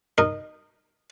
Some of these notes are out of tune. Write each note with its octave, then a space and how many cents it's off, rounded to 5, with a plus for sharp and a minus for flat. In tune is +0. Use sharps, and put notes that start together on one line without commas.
D#4 -15 A#4 +0